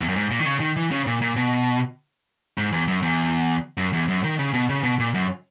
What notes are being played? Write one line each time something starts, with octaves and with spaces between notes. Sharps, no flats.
E2
F#2
G#2
A#2
D#3
C#3
D#3
E3
C#3
A#2
A#2
B2
G#2
E2
F#2
E2
F#2
E2
F#2
D#3
C#3
B2
C#3
B2
A#2
F#2